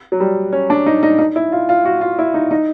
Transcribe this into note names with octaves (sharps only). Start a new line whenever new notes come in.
F#3
G3
C#4
D4
D#4
D#4
D#4
E4
F4
F4
F#4
F4
E4
D#4
D#4